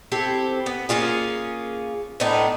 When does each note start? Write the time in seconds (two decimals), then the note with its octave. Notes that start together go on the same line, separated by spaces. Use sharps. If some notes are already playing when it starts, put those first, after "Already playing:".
0.12 C4 E4 G4 A4
0.66 B3
0.89 A#3 C#4 F4 G#4
2.20 A2 B3 D4 D#4